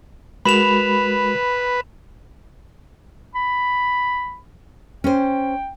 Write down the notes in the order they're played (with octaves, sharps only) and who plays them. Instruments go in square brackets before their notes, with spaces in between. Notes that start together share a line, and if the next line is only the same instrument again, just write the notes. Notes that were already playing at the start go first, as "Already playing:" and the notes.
[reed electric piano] G#3 F#4 A#4 [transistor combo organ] B4 [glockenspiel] B5 E7 F7
[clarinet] B5
[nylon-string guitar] C#4 C5 [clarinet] G5